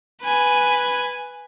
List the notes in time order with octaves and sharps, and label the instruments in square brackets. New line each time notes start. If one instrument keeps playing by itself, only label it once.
[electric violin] B4 G#5